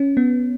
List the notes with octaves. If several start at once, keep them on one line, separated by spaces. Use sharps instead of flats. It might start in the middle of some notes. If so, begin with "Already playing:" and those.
Already playing: C#4
B3